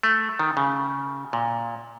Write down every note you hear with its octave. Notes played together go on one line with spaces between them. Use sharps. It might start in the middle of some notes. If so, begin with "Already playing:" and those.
A3
D#3
C#3
A#2